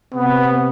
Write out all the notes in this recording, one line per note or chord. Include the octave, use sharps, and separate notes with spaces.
C3 B3